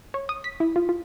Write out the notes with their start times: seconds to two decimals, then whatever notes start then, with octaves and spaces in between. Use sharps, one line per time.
0.14 C#5
0.29 D#6
0.44 B6
0.60 E4
0.76 F4
0.89 F4